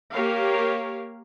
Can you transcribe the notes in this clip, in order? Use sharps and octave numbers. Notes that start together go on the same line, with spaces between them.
A#3 G4 A#4 C#5 F5